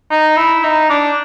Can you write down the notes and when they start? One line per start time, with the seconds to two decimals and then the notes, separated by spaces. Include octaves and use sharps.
0.10 D#4
0.37 E4
0.63 D#4
0.90 D4